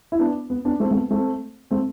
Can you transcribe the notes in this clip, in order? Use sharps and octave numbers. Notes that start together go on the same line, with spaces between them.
E4
B3 D4
B3
B3 D4
A3 C4
A3
B3
A3 C4
A3 C4